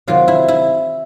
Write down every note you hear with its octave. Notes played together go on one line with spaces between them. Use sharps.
C3 D#3 F#3 F4
E4
E4